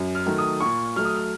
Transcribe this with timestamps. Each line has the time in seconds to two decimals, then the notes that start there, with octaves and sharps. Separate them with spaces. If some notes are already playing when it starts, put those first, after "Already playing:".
Already playing: F#2
0.15 F6
0.26 D#3 F#3 A3
0.38 D#6
0.60 A#2 C#6
0.96 F#3 A3 F6
1.05 D#6
1.16 F6